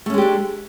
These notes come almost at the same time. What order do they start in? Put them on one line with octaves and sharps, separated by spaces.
A3 C#4 G#3 G4 D4